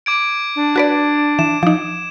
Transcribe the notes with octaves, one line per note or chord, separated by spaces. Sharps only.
D6 G#6 D7
D4
F#4 B4 D5
E3 E7
F3 D#4